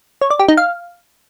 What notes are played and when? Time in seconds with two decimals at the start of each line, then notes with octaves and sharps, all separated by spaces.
0.21 C#5
0.30 D5
0.39 G4
0.48 D#4
0.57 F5